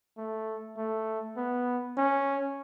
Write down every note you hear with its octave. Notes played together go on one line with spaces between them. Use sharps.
A3
A3
B3
C#4